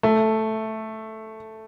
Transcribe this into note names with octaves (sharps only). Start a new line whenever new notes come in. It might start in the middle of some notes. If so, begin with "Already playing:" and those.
A3